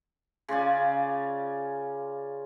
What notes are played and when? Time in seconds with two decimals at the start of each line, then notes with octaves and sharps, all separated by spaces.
0.48 C#3 F4 D5 G#5